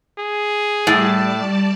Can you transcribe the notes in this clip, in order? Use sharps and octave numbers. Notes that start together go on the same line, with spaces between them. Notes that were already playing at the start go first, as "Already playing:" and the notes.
G#4
A2 G3 D5 A5